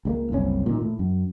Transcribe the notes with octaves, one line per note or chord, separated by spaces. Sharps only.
C#2 G3 A#3
F#1 C2 C#4
A#2 D#3
A2
F#2